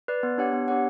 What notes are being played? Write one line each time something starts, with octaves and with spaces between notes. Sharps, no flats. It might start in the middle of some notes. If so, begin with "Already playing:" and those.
B4 D5
B3
D4 G4 C#5 F#5
B3
D4 G4 C#5 F#5